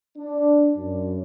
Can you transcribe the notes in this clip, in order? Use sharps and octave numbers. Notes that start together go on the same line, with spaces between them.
D4
F#2